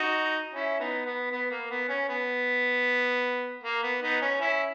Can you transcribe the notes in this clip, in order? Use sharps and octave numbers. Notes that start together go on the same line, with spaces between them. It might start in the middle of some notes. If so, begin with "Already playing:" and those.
Already playing: D#4 F#4
C#4 E4
B3 D#4
B3
B3
A#3
B3
C#4
B3
A#3
B3
B3 D#4
C#4
C#4 E4